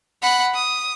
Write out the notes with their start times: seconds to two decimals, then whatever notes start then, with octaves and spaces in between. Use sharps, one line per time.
0.22 F#5 B5
0.55 D#6